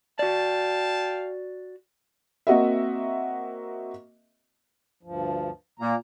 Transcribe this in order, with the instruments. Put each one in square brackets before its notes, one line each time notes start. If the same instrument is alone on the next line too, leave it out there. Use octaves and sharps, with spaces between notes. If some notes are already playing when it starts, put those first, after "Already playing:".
[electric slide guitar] F#4 D5 [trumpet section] F5 G5 A5
[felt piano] A#3 C4 F#4 D#5 E5
[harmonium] D2 G2 F3
[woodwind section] A#2 A#3 [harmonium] A#5